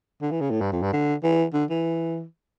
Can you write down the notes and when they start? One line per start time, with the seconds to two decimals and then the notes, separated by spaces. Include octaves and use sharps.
0.22 D3
0.31 E3
0.41 C#3
0.51 A2
0.61 G2
0.72 F2
0.82 G2
0.93 D3
1.23 E3
1.53 D3
1.70 E3